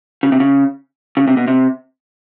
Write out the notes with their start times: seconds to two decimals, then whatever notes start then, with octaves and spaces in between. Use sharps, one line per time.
0.23 C#3
0.32 C3
0.40 C#3
1.17 C#3
1.27 C3
1.37 B2
1.48 C3